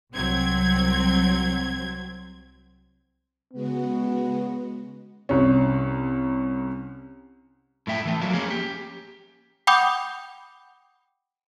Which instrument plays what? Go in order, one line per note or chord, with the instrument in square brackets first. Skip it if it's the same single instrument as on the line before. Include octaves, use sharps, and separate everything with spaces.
[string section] C2 F#3 C4 G#6
[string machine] C#3 G#3 F#4 [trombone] B3
[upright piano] C2 C#4
[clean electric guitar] A2 A3 E5 G5
E3 A3
F3 F#3 A#3
A#3 C#4 G#4
G4
[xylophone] F#5 G5 B5 D6 D#6 G6